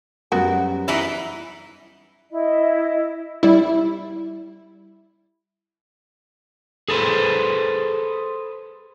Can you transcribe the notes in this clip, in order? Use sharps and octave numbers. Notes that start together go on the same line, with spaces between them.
F#2 G3 B3 F#4 A#4
E3 D#4 E4 E5
E4 D#5
G3 E4
G#4 A4 B4 C5